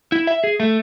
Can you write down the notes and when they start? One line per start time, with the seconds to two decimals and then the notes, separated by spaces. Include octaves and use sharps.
0.12 E4
0.27 E5
0.44 G#4
0.60 A3